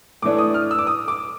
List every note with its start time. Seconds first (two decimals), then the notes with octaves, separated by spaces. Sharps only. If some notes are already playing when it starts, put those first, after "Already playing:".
0.22 A2 E3 A3 D4 D6
0.38 D#6
0.54 F6
0.71 E6
0.79 D6
0.87 D#6
1.08 D6